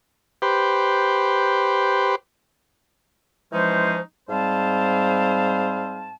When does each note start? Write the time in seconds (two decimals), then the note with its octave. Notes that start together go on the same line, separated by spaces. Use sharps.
0.42 G4 B4 C5
3.52 E3 F3 G#3 C#4 D#4 C5
4.29 G#2 G3 C4 C5 F5 A5